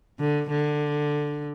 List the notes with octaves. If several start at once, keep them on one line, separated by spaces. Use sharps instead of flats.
D3
D3